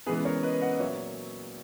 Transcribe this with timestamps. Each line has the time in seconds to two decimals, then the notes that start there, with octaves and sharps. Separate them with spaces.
0.06 C#3 E3 G#3 B3 G#4 B4
0.25 A#4 C#5
0.43 B4 D#5
0.61 D#5 F#5
0.75 D#5
0.79 A#2 F#3 A#3 C#5 E5